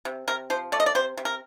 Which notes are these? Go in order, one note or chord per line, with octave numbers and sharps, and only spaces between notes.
C3
C3 A#4
F3 C5
A3 D5
D#5
D5
C3 C5
C3
A#4